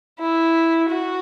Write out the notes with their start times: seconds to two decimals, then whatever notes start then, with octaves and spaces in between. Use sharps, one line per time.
0.20 E4
0.89 F#4